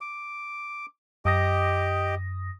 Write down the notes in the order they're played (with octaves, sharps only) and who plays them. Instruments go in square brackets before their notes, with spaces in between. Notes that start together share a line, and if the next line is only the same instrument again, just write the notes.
[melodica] D6
[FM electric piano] F#2 D#6 A#6 [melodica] G4 D#5 D6